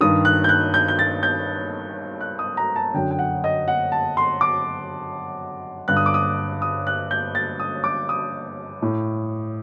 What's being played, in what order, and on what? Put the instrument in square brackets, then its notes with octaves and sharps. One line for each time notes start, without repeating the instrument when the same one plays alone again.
[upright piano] G2 D#3 D#6
F#6
G6
F#6
G6
G6
A6
G6
F#6
D#6
A#5
A5
F#2 D3 G5
G5
F#5
D#5
F#5
A5
C6
D6
G2 D3 F#6
D#6
D6
D#6
D#6
F#6
G6
A6
D#6
D6
D#6
A2